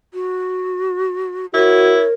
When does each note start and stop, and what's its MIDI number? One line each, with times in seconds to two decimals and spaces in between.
0.14 1.46 66
1.54 2.04 64
1.54 1.96 66
1.54 2.14 70
1.54 2.09 73